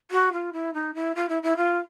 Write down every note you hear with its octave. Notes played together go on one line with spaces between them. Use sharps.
F#4
F4
E4
D#4
E4
F4
E4
E4
F4